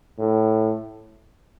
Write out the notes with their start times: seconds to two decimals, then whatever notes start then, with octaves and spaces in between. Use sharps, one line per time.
0.18 A2